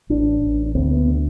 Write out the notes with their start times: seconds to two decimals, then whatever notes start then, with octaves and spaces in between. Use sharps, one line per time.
0.09 A1 D4
0.41 A1
0.66 D4
0.75 D2 C4
0.91 B3
1.07 D3